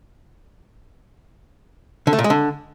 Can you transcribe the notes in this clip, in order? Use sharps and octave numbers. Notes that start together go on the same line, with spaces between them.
D3
A3
A#2
G#3
D3